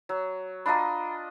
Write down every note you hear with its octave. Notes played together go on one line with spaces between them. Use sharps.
F#3
D4 F4 D#5 A#5 B5